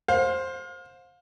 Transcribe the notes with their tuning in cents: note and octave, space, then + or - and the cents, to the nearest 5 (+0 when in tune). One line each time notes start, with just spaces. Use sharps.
C5 +10 F5 +30